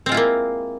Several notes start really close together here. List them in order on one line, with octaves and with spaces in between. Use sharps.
C4 G#3 F4 E4 A#3